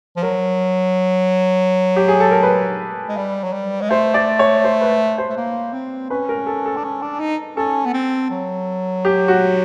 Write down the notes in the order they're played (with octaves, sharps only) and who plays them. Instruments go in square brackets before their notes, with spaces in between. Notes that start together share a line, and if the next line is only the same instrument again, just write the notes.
[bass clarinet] F3
[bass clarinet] F#3 [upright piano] A#4
[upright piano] G4
G#4
A4
A#4
B4
[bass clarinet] G#3
G3
F#3
G3
G#3
[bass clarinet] A3 [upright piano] C5
[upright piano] D5
C#5
C5
B4
C5
[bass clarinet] A3
A#3
C4
[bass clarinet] C#4 [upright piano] B4
[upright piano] A#4
A4
A4
[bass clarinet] D4
C#4
D4
D#4
[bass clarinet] C#4 [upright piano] A4
[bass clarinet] B3
C4
F#3
[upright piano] G4
F#4